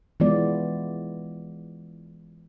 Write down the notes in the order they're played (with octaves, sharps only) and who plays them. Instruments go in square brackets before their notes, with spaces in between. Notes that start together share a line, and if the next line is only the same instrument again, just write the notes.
[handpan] E3 G#3 B3 F4 D5